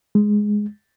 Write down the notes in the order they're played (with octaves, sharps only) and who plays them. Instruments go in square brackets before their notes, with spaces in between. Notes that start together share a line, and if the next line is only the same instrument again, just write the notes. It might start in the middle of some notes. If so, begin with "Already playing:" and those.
[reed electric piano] G#3